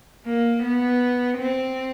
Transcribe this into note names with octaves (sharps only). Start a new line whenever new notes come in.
A#3
B3
C4